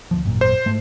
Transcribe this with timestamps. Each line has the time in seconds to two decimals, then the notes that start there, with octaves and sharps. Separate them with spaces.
0.11 D2 G#2 F3
0.24 G#1 F#2 A#2
0.41 C5
0.66 G#2 G#3 A3